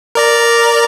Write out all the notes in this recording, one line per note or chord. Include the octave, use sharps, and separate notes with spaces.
A#4 D5 A#5